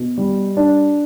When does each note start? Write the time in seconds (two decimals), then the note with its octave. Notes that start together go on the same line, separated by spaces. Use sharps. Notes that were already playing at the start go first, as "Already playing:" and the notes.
Already playing: B2
0.18 G3
0.57 D4